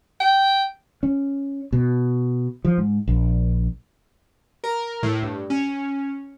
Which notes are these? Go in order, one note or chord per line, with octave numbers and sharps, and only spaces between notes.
G5
C#4
B2
F3
G#2
A#1
A#4
A2
G2
C#4